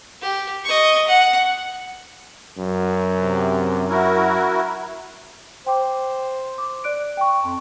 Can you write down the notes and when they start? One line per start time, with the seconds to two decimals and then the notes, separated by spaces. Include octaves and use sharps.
0.22 G4
0.64 D#5 C#6
1.07 F#5
2.58 F#2
3.16 C3
3.89 E4 F#4 A#4
5.67 C5 G5 D6
6.58 D6
6.84 D5 F#6 D7
7.17 G5 C#6
7.43 F2 A5 C6